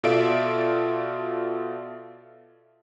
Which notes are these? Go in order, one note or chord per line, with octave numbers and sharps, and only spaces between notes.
B2 F4 A4 D5 E5 D7